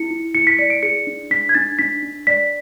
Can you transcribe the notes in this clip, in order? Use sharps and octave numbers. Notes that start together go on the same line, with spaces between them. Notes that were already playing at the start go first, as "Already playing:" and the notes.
Already playing: E4 C#7
E4
E4 C#7
B6
D5 C#7
D7
G#4 C#7
D4
D4 B6
G#6
D4 A6
D4 B6
D4
D5 B6